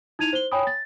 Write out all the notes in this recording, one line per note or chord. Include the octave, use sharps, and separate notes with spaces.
D#4 E4 G#6 D#7 F7
C5 G7
C#5 G5 G#5 B5 D#6
A6